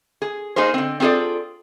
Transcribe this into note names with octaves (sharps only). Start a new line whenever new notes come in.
G#4
A#3 D#4 G#4 A#4 C5
D3 C4
C4 F4 G#4 A4 D5